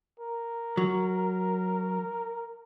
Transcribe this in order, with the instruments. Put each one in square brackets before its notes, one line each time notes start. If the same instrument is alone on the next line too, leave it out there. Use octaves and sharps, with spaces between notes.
[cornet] A#4
[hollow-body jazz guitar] F#3